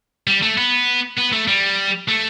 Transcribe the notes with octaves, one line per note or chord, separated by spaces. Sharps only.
G3
A3
B3
B3
A3
G3
A3